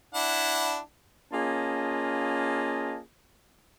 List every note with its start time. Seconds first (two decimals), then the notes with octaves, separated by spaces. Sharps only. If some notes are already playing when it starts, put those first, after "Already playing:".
0.15 D4 E4 F#5
1.33 A#3 C#4 F4 G#4 D#5 A5